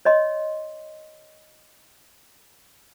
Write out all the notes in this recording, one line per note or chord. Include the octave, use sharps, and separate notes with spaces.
C#5 D#5 C6